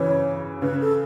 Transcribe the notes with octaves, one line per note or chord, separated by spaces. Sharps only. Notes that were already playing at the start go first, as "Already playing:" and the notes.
Already playing: C#3 E3 C#5
C#3 B4
A4